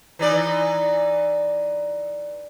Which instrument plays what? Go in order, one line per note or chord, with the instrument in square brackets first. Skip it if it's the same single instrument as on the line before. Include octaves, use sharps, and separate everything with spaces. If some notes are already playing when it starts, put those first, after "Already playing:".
[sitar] E3 D#4 D5